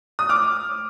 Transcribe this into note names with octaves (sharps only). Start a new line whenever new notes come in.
D#6
D6 F6